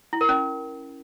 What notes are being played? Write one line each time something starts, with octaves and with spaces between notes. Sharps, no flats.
E4
A#4
C#4